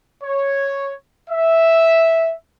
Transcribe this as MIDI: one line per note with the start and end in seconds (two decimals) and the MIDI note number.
0.24 0.92 73
1.30 2.33 76